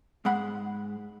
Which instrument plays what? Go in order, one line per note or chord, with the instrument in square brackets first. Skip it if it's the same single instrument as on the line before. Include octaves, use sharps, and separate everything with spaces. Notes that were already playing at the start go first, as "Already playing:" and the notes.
[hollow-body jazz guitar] G#2 G#3 F#5 B5